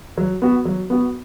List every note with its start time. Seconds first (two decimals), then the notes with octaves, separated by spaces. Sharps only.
0.18 F#3
0.42 B3 F#4
0.65 F#3
0.90 B3 F#4